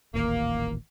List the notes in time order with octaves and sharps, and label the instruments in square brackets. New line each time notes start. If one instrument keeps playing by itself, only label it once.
[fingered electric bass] D#1 A1 D#2 [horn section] A#3